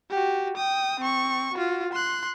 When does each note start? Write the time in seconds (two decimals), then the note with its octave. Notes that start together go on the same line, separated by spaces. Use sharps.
0.10 F#4 G4
0.57 G5 D#6
1.00 C4 C#6
1.54 F4 F#4
1.93 C6 F#6